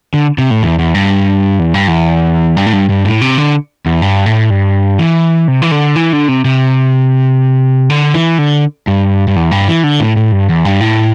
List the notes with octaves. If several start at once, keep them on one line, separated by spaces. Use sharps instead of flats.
D3
C3
A2
E2
E2
G2
E2
G2
E2
G2
A2
G2
G2
A2
C3
D3
E2
G2
A2
G2
E3
C3
E3
D3
E3
D3
C3
C3
D3
E3
D3
G2
G2
E2
G2
E3
D3
A2
A2
G2
E2
G2
A2